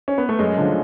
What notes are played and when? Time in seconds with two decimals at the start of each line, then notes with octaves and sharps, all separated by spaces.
0.08 C#4
0.18 B3
0.29 A3
0.39 F#2 G#3
0.58 D3 F3